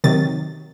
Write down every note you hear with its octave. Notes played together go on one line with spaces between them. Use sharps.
C3 D#3 F#3 A6